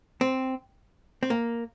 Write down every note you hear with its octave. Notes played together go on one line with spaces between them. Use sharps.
C4
C4
A#3